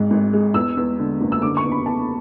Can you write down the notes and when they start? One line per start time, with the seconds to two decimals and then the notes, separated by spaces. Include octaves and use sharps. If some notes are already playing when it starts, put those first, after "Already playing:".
Already playing: G#1 G#2
0.11 G#1
0.33 G#3
0.54 E2 E6
0.77 E2
0.99 D3
1.21 F#1
1.32 E6
1.42 D3 D6
1.57 C#6
1.64 E2
1.72 B5
1.86 E2 A5